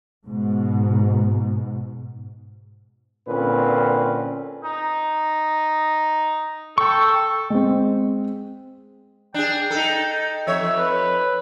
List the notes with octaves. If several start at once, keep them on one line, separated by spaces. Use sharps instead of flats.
G#2 B2
A#2 D3 C4 C#4 B4
D#4
A4 G5 C#6
G#3 C4
D4 G#4 G5
D#4 A4
F2 C#5 E5
B4